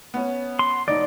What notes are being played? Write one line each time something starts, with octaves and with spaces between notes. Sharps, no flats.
B3 C#4
C6
E1 D#4 D5